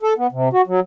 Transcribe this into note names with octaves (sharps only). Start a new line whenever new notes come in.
A4
B3
C3
F#4
F#3